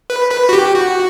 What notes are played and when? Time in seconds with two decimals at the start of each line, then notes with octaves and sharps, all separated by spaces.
0.10 B4
0.31 B4
0.49 F#4
0.53 G4
0.75 F#4